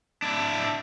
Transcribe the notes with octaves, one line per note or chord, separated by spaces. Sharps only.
D4 E4